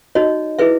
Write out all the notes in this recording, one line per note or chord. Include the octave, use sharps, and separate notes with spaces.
D#4 F#4 C#5 D#5
E4 G#4 B4 E5